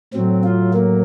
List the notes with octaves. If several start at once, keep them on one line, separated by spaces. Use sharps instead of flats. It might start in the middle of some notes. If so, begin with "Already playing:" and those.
A2 F#3 C4
F4
A#3